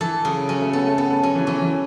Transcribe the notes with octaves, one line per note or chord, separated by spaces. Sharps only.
E3 A4
C#3 F#3
F#3 C#4
A3
B3 A4
A3
B3 A4
B3
F#3 C#4
E3
E3 C#4
F#3
E3